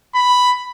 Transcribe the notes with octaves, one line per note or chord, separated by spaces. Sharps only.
B5